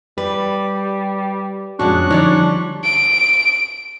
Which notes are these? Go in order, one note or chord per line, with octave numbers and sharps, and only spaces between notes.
G3 B4
F2 A#2 G#3 C#4 D4 F#4 C#6 F#6
D3 F3 G3 D#4 C#5 D5
D7